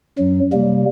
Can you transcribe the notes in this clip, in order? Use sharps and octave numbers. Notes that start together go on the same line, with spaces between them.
F#2 F#3
C3 G3 A#3